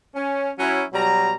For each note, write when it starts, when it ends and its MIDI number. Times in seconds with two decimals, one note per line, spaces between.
0.15 0.50 61
0.59 0.83 54
0.59 0.83 61
0.59 0.83 64
0.93 1.34 47
0.93 1.34 54
0.93 1.34 55
0.93 1.34 82